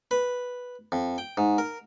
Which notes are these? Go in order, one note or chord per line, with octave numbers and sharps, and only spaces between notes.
B4
F2
G5
G#2
A#4